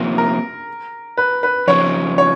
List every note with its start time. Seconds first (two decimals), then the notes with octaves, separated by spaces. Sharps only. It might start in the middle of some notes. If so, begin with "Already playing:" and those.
Already playing: C3 F3 A#3
0.18 A#4
1.17 B4
1.43 B4
1.68 F2 C#3 F3 C#5
2.18 C#5